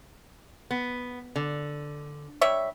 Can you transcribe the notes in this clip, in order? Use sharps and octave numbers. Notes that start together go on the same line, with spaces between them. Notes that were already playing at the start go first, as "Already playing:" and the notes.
B3
D3
G3 C#5 E5